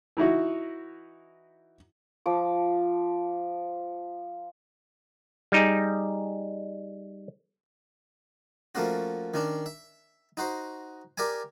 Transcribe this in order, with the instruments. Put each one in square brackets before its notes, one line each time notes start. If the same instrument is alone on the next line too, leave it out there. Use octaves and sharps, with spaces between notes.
[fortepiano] E3 D#4 E4 F#4
[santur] F3 D6
[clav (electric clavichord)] G3 D#4 G#4
[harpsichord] F3 A3 A#3 C#4 F#4
D#3 C#4 D4
E5
D#4 F#4 C5 C6
G4 A#4 D5 E5 G#5